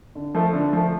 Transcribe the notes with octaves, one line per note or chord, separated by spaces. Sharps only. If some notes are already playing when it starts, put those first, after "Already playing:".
D3
F3 A3
D3
F3 A3